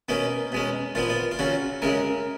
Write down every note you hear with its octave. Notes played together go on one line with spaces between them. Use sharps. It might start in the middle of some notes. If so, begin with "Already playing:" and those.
B2 A#3 C#4 D#4
B2 G#3 C#4
A#2 F3 B3 F4
F4
F4
C#3 F#3 C#4 F#4
F#2 C#3 G#3 A#4